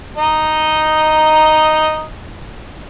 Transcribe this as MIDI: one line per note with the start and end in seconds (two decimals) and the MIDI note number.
0.17 2.05 63
0.17 2.05 75